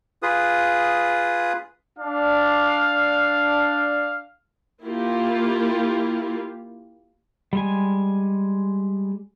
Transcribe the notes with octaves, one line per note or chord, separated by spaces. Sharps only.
F4 G#4 B4 D#6
D4 F5
A#3 E4 F4 G4
G3 G#3 G#5